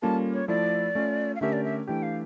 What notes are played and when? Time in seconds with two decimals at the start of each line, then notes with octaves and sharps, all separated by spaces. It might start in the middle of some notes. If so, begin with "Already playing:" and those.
0.02 G3 A#3 C#4 F4 A4 A5
0.34 C#5
0.48 F3 A3 E4 A4 D5
0.95 A3 C#4 F4
1.36 F5
1.41 D3 A3 C#4 G4 A#4 E5
1.53 D5
1.64 E5
1.88 E3 A3 D4 G4 G5
2.03 F5